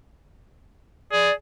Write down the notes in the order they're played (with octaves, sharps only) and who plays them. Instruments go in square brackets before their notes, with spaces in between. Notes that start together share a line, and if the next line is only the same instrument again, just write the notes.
[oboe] G#4 [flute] D5